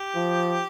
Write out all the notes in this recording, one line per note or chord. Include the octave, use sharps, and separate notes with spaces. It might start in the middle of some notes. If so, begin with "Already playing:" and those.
Already playing: G4
F3